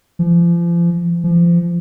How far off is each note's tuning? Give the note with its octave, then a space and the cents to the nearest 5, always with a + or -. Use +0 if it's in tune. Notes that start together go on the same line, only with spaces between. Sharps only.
F3 -35
F3 -30